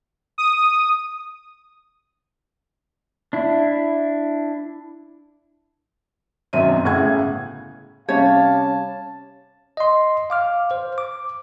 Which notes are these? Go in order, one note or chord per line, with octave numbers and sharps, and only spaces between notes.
D#6
D4 E4
G#1 F#2 B2 C4 E5 D#7
G1 A2 C#3 F#5 G#5 G#6
C3 G3 C#4 C#5 F5 A5
D#5 C6
F5 D6 F6
C5
D6